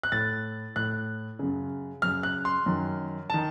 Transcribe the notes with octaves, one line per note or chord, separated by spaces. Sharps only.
F#6
A2 A6
A2 F#6
F#2 C#3
F#2 C#3 F6
F#6
C6
F#2 D#3
D#3 A5